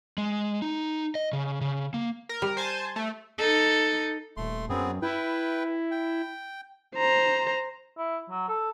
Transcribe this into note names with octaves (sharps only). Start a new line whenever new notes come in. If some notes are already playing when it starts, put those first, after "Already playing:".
G#3
D#4
D#5
C#3
C#3
A#3
A#4
G3
C5 G#5 A5
A3
D#4 A4
D#1 A3 C6
F#2 B3 C4 G#4
E4 B4 G5
G5
C5 A#5
E4
F#3
A4